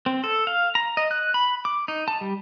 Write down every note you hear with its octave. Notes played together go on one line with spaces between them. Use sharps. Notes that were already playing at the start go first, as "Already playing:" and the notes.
C4
A4
F5
A#5
D#5
F#6
B5
D6
D#4
A5
G3